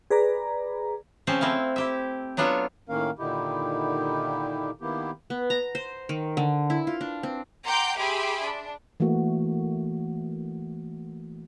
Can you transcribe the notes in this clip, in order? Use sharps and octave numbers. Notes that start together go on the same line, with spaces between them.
G#4 B4 D5 A#5
C#3 F3 C4 C#4 C5 A5
A3 C4 E4 F5
E4 G4 E5
F#3 B3 D4 F4 A4 C#5
A2 D#3 A#3 C#4 A#4 F5
A#2 D3 D#3 D#4 E4 G4
D#3 A#3 B3 E4 G4
B3
A#5
C5
D#3
D3
E4
F4
D4
C4
F#5 G5 A#5 C6 D6 G6
G4 G#4 E5 B5 C6 D6
D4
E3 A3 A#3 F#4